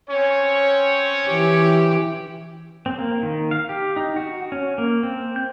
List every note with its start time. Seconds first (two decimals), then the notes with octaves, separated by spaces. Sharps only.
0.10 C4 C#4 C#5
1.27 E3 G4
2.86 C4
2.98 A#3
3.23 D#3
3.51 F5
3.69 G4
3.96 D#4
4.16 F#4
4.52 C#4
4.78 A#3
5.03 C4
5.36 G6